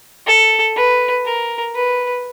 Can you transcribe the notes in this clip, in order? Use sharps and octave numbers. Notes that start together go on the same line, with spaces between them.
A4
B4
A#4
B4